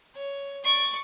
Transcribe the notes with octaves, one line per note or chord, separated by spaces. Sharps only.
C#5
D5 C#6